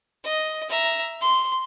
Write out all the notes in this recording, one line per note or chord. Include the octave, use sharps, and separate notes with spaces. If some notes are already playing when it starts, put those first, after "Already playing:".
D#5
E5 A#5
C6